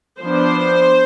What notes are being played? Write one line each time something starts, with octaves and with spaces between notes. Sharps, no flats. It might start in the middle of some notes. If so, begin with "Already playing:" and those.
F3 B3 D4 C5